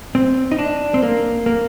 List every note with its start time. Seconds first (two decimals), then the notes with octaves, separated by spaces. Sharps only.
0.15 C4
0.51 D#4
0.59 D4
0.94 C4
1.03 A#3
1.46 A#3